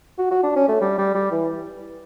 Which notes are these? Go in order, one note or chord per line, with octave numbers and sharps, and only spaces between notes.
F#4
F#4
D4
C#4
A3
G3
G3
G3
E3